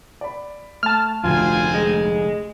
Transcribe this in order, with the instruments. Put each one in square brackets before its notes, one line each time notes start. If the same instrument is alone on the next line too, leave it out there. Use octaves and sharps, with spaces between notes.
[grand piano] D5 B5
[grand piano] A3 [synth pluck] A5 F6
[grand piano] F1 D2 [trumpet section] A#3 C4 G#5 [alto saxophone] F4
[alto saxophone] G#3